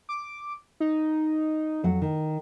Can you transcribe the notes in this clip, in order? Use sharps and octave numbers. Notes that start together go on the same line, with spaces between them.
D6
D#4
F2 F#3 F#5
D#3